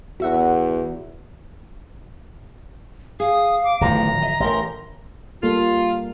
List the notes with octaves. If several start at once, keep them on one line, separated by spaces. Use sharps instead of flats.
E2 F#4 E5 F#5
G#4 F5 D#6
D6
D1 E2 A2 D#3 F3 A#5
D#5 E5
A1 G4 A#4 C6
G3 A#3 F4 A4